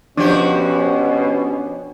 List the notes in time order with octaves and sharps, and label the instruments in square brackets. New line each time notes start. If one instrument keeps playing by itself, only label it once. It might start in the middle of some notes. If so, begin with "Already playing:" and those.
[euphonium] B2 [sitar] F3 F#4 G4 [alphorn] C#4 [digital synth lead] D4